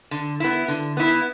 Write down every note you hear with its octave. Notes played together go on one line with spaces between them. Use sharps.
D3
B3 E4
D3
B3 E4